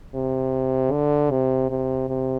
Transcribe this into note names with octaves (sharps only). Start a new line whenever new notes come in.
C3
D3
C3
C3
C3